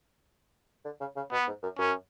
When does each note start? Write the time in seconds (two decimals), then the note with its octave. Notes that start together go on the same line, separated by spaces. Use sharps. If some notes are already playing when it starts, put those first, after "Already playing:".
0.85 D3
1.00 C#3
1.16 C#3
1.31 B2 B3
1.47 G#2
1.63 F#2
1.78 F#2 C#4